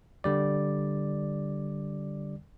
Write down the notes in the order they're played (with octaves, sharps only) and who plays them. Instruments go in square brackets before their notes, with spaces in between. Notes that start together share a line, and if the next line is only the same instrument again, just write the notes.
[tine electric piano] D3 G3 D5